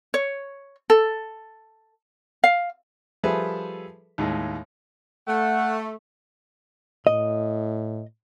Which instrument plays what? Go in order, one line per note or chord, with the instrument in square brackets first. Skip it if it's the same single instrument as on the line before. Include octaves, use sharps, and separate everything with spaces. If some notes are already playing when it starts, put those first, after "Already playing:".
[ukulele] C#5
A4
F5
[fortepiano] F3 G3 G#4 A4 B4 E5
D#2 A2 G#3
[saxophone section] A3 [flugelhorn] F#5
[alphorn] A2 [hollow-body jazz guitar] D#5